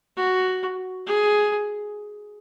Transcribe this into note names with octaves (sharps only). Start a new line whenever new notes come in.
F#4
G#4